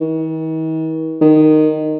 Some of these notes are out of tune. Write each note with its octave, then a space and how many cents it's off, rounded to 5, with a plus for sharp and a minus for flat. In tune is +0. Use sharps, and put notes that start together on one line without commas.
D#3 +45
D#3 -10